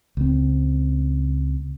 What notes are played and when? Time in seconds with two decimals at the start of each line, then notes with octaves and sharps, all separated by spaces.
0.17 C#2 C4